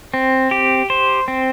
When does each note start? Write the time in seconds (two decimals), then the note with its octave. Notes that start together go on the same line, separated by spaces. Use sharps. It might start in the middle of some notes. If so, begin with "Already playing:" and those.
0.14 C4
0.51 G4
0.90 C5
1.28 C4